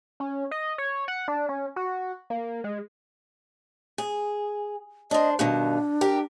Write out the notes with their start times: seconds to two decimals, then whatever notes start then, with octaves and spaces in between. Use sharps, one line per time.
0.20 C#4
0.51 D#5
0.78 C#5
1.08 F#5
1.28 D4
1.49 C#4
1.76 F#4
2.30 A#3
2.64 G#3
3.98 G#4
5.11 D4 C5 D#5
5.39 G2 B2 D#3 D4
6.01 G4 A#4